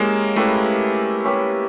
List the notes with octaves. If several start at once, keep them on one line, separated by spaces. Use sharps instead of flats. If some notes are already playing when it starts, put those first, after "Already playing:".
Already playing: G#3 A#3 C#4 E4 G4
A3 C#4 E4 G4 B4
C#4 E4 G4 B4